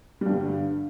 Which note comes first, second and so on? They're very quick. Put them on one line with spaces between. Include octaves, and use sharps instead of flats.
G3 G2 D3